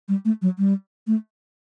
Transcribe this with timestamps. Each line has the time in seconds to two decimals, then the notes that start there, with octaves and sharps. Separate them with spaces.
0.08 G3
0.25 A3
0.42 F#3
0.58 G3
1.07 A3